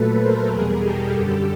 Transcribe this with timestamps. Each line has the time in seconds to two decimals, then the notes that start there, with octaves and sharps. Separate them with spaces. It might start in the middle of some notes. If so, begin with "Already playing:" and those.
Already playing: A#2 F#3 A3 A4 B4
0.20 A#4 C5
0.50 E2 B2 G3 G#4 A#4
0.82 G4 A4
1.13 F#2 D3 G3